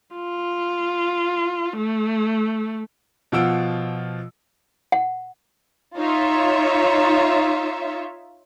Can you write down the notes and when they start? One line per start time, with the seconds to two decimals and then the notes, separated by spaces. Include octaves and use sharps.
0.16 F4
1.77 A3
3.32 B2 F3 F4 F#5 E6 D7
4.92 F#5
5.97 D#4 F4 C#5 E5